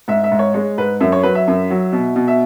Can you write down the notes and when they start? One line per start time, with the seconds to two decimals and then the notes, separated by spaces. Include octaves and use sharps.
0.08 G#2 E5
0.24 E5
0.32 G#2
0.39 C#5
0.54 G#3 C#5
0.78 G#2 B4
1.00 F#2 E5
1.12 C#5
1.23 F#3 B4
1.35 E5
1.48 F#2
1.70 F#3
1.92 B2
2.16 B2
2.28 E5